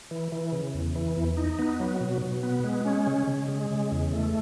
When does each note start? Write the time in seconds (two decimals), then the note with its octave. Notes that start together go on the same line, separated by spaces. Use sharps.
0.11 E3
0.32 E3
0.52 C#3
0.74 E2
0.95 E3
1.16 E2
1.37 D#4
1.59 B3
1.80 F#3
2.01 B2
2.22 B2
2.43 B3
2.64 G#3
2.85 C#4
3.07 C#3
3.27 C#3
3.48 G#3
3.70 C#3
3.91 E2
4.13 A3